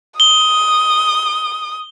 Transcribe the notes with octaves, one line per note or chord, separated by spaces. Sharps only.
D#6 G7